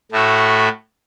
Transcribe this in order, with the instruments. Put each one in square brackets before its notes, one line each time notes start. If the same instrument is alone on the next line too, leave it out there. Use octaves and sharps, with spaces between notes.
[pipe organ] A2 A3 F#4 A4